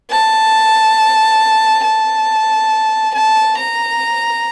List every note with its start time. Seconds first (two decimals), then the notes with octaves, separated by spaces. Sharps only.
0.10 A5
1.83 A5
3.14 A5
3.57 A#5